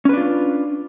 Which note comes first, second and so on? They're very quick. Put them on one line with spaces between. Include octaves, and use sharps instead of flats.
C#4 B4 D4 F4